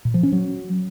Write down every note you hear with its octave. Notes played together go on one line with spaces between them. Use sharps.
A#2
F3
C#4
F#3